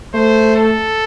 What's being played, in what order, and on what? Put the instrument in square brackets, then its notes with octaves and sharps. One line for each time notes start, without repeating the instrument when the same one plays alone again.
[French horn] A3 [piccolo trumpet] C5
[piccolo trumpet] A4